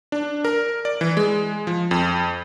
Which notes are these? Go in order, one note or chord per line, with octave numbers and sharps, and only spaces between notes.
D4
A#4
D5
E3
G#3
F3
F2